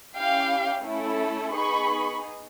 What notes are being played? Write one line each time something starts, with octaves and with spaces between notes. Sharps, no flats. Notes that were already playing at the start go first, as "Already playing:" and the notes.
C#4 E4 G4 F5 G5
A3 C#4 E4 A4
B3 D#4 G#4 B5 C#6